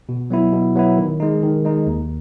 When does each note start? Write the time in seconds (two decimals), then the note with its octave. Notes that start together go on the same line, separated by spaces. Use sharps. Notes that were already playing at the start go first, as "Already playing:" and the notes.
0.09 B2
0.30 F#3 B3 E4
0.53 B2
0.75 F#3 B3 E4
0.98 D#3
1.20 G#3 D#4
1.43 D#3
1.65 G#3 D#4
1.87 D#2